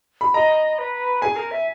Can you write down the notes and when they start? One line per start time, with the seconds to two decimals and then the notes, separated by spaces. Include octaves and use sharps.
0.21 B5
0.34 D#5 A#5
0.78 B4
1.22 G#4 G#5
1.36 A#4
1.51 E5